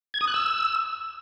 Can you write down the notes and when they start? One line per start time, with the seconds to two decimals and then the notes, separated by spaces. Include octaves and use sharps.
0.14 G#6
0.21 D#6
0.28 F#6
0.34 E6